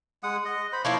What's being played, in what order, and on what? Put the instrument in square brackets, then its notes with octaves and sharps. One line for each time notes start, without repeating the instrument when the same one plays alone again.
[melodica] G#3 F#5 D#6
D#5
C5 B5
[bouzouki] F3 A#3 E4 [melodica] C#5 C6 D6